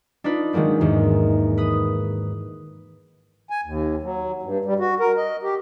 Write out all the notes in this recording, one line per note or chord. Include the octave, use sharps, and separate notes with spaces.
D4 D#4 F4 B4
D#3 F#3 G#3 A#3 C4
E2 G#2 D#3
B4 D#6
G#5
D#2
F#3
G2
G3
F#4
A#4
D#5
G4